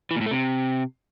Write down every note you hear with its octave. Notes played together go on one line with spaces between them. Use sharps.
E3
A#2
A2
A3
C3